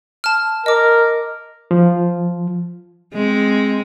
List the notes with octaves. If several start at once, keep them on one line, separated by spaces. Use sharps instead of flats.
A5 F6
A#4 D#5 D6
F3
G#3 C4